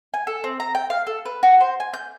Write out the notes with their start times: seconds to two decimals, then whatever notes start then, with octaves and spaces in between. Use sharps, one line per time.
0.14 G#5
0.27 A4
0.44 C4
0.60 A#5
0.75 G5
0.90 F5
1.07 A4
1.25 B4
1.43 F#4
1.60 C5
1.80 G#5
1.94 G6